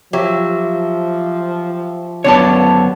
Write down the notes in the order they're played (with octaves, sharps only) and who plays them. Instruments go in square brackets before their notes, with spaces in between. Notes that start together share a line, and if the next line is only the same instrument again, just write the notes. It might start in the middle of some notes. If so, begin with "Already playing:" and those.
[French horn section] F3 [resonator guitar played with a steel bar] F#3 [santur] G4 E5
[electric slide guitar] F#2 B3 C#5 [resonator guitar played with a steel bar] D3 D5 A5